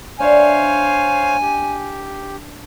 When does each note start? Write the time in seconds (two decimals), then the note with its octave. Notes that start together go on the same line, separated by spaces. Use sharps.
0.20 D4 C5 C#5 E5 F5 G#5
1.42 G4